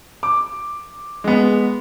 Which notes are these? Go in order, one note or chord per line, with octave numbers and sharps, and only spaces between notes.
D6
G#3 B3